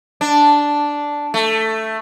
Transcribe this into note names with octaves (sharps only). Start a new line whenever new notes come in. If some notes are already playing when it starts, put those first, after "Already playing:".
D4
A3